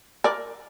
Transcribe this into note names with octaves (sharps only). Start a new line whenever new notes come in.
A#4 D5